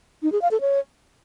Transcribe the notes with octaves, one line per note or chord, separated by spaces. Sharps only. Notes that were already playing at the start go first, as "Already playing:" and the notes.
D#4
G#4
F5
A4
C#5